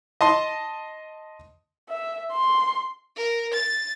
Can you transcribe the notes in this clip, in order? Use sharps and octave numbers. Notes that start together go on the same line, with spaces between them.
D#5 A5 C6
E5
C6
A#4
A6